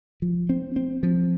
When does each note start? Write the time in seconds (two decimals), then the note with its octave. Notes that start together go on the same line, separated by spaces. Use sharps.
0.22 F3
0.49 C4
0.76 C4
1.03 F3